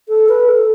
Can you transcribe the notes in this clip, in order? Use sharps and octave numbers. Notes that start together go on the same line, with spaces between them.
A4
B4
A4